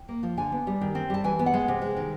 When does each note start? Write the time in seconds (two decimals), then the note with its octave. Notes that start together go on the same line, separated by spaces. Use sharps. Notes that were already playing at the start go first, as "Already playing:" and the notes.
Already playing: G5
0.08 A#3
0.23 F3
0.37 D3 G#5
0.52 B3
0.67 G3
0.81 D#3
0.95 C4
1.10 G3 A5
1.24 E3 G#5
1.39 B3
1.46 F#5
1.54 G#3
1.68 C3
1.82 G#3
1.97 D#3